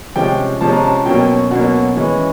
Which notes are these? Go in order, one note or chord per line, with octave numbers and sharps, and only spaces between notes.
C3 F3 G#3 C#4 G5
C3 F3 G#3 C#4 A5
A#5
A5
B2 F#3 A#3 C#4 G5
B2 F#3 A#3 C#4 F#5
E3 G#3 C#4